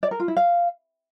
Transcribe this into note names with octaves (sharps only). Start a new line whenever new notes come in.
D5
A#4
F4
E4
F5